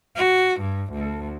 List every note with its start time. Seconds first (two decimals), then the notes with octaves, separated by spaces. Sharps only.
0.15 F#4
0.61 G2
0.93 D2